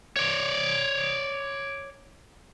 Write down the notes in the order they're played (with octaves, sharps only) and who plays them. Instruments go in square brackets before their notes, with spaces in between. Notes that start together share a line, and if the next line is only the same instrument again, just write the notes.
[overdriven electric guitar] C#5 D5